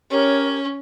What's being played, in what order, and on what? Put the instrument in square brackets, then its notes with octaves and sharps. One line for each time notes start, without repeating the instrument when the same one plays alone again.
[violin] C#4 [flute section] G4 A#4 C#5